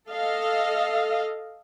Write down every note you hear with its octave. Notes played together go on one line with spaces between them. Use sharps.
A4 D#5 F5